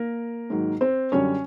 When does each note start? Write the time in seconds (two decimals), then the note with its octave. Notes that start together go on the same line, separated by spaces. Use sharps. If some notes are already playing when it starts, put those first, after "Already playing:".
Already playing: A#3 A#4
0.50 G#2 D#3 F#3
0.81 C4 C5
1.12 F#2 D3 G3 C#4 C#5